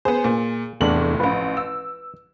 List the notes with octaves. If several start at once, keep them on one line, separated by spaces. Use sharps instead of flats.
B3 G#4 C5
A#2
F1 E2 A2 D4 F#7
A1 F3 B4
E6